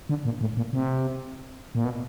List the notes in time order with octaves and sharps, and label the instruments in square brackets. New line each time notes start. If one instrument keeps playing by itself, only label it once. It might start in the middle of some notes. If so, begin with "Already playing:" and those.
[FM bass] D3
A#2
A2
A#2
C3
A#2
B2